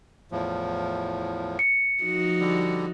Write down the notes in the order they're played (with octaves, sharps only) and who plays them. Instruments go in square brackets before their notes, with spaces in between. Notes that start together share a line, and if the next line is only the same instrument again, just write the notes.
[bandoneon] E2 A2 F3
[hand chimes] C#7
[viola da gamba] F3 D#4 F#4
[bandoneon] D3 G3